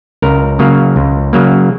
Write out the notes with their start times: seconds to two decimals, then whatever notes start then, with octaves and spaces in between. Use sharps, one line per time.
0.22 C#2 A#4
0.59 C#3 F#3 A#3
0.96 C#2
1.33 C#3 F#3 A#3